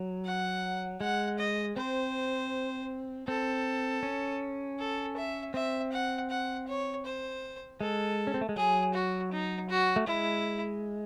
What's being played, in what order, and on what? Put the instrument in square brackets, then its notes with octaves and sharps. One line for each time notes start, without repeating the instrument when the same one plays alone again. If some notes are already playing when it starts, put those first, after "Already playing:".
Already playing: [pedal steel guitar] F#3
[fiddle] F#5
[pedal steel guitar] G#3 [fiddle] F#5
[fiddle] D#5
[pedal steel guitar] C4 [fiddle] C5
[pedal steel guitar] C4 [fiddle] A4
[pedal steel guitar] C#4
[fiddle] A4
E5
[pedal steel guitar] C4 [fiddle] E5
[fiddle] F#5
F#5
C#5
C5
[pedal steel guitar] G#3 [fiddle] A4
[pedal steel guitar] C#4
C4
A3
G#3
[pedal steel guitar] F#3 [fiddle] G#4
[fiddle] F#4
D#4
F#4
[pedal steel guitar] A3
[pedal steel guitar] G#3 [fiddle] E4